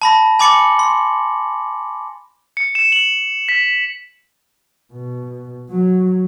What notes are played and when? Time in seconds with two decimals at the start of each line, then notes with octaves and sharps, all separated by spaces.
0.02 A5 B5 A#6
0.39 G#5 B5 D6 A6 C#7 F#7
0.79 C6
2.57 C#7
2.75 E7
2.92 F#7
3.49 B6
4.92 B2
5.70 F#3